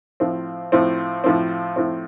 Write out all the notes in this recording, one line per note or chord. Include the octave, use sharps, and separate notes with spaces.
A2 F3 C4
A2 F3 C4
A2 F3 C4
A2 F3 C4